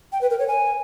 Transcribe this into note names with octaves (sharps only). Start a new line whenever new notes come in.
G5
B4
A#4
C#5
G#5